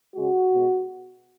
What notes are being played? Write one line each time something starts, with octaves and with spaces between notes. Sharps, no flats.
C#3 G#3 F#4
B2 G#3